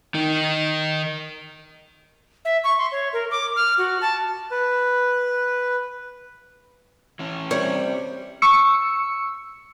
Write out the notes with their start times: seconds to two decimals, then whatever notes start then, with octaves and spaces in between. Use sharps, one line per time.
0.14 D#3 D#4
2.45 E5
2.64 C#6
2.78 C6
2.92 C#5
3.13 A#4
3.31 D6
3.56 F6
3.78 F#4
4.01 A5
4.51 B4
7.19 E3 C#4
7.51 C3 G3 C#5
8.42 C#6 E6 C#7